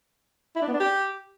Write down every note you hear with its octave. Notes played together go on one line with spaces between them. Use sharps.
E4
D4
B3
D4
G4